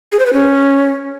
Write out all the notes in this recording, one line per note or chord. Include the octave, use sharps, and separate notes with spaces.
G#4
C5
B4
C#4